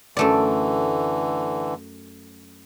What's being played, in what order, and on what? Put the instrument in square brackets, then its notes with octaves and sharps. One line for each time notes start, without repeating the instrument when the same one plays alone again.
[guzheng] F#2 A3 D5 [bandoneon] D3 E3